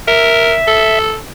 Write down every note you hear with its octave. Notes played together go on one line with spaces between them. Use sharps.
A#4 E5
A4